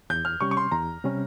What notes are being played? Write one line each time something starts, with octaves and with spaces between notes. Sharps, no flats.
E2 G6
F6
C3 G3 C#4 C#6
C#6
C6
E2 A#5
C3 G3 C#4